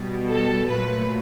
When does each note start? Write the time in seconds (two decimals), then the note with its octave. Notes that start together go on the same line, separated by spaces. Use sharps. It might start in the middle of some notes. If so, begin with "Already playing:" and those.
Already playing: B2 G3
0.28 A4
0.68 A#2 F#3 A3 B4